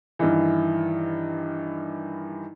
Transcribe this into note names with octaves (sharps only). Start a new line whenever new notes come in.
G2 D#3 E3